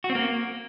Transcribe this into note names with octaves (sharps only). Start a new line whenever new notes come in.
F#4
C4
A#3